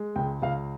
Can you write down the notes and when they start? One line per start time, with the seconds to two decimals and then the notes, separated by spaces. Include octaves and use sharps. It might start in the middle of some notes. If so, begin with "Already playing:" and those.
Already playing: G#3
0.16 C#2 G5
0.42 C#2 F5